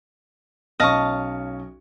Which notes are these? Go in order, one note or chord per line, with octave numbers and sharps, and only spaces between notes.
B1 C#4 D#5 F5 A5 C#6